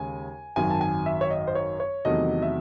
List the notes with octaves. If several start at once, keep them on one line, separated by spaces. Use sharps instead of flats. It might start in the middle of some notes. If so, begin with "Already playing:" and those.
Already playing: D#2 C#3 G#3 G#5
G#1 F#2 D#3 F#3 G#5
A5
G#5
E5
C#5
D#5
C5
C#5
C#5
E2 C3 D#3 F#3 A3 D#5
E5